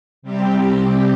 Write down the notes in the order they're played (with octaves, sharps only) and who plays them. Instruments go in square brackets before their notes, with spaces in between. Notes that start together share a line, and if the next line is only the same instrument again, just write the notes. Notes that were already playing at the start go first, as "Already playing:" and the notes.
[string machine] C3 G3 C4 G4